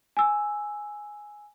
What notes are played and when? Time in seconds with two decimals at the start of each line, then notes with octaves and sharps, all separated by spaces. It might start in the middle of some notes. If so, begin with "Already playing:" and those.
0.17 G#5 E6